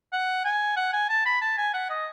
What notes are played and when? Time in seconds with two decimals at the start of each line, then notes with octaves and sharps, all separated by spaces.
0.13 F#5
0.45 G#5
0.77 F#5
0.93 G#5
1.09 A5
1.26 B5
1.41 A5
1.58 G#5
1.74 F#5
1.90 D#5